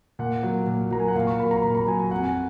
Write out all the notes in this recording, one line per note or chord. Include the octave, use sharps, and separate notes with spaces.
A#2 F#5
F#3 A#3
A#2
F#3 A#3 A#5
G#5
F#5
A#2 F5
C#6
F#3 A#3 B5
A#5
A#2 B5
A#5
F#3 A#3 G#5
G#5
F2 F#5
G#5